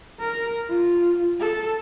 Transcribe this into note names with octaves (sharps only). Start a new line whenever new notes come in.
A#4
F4
A4